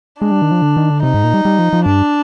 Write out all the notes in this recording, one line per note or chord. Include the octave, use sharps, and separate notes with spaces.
G#3 D4
G3
D#3
F3
D3
D#3
D3
C3 D#4
G#2
A#2
G3
G3
F3
F3
G2 D4